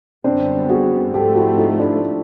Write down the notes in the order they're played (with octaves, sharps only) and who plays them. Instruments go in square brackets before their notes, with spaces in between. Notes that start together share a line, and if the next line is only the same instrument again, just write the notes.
[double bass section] F#2 D3 G3 B3 [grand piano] C4 D4
[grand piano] F#4 G#4
[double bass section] G#2 F3 A3 C4 [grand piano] G4 A4
[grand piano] E4 F#4
D#4 F4
D4 E4